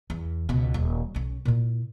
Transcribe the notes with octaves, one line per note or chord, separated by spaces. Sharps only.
E2
C#2 B2
D#1
B1 C#4
A#2 E4